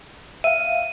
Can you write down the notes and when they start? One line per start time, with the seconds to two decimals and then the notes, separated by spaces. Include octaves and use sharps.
0.44 E5 F5 D#7